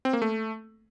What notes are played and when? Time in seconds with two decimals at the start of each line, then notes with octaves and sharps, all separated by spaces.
0.05 C4
0.13 A#3
0.22 A3